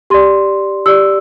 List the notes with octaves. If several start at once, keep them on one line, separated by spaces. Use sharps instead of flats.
G4 D5 C6
G4 D5 E6